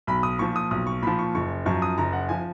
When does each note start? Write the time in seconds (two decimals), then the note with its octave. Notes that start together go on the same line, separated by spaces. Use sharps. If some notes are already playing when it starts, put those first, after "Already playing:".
0.07 B1 B5
0.23 D#6
0.39 A#2 F3 C#6
0.56 D#6
0.71 B1 D#6
0.87 C#6
1.02 A#2 F3 B5
1.19 C#6
1.35 F#1 C#6
1.65 F#2 F3 C#6
1.82 D#6
1.98 F#1 A#5
2.13 F#5
2.29 F3 G#5